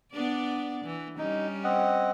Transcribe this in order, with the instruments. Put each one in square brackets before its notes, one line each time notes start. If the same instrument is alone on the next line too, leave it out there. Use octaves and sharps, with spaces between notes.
[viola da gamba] B3 D4 D5
E3
[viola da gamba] G3 C#4 [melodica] D#4
[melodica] C4 D#5 F#5